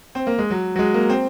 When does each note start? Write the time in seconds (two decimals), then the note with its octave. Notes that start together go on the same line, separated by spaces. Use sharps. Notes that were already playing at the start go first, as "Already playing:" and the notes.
0.15 C4
0.27 A#3
0.39 G#3
0.50 F#3
0.76 F#3
0.79 G#3
0.94 A#3
1.10 C4